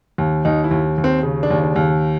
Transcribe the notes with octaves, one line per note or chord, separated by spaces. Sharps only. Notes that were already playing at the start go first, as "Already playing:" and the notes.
D#2
D#2 D#4
E4
D#2
D#2
C4
C#3
D4
D#2
D4
D#2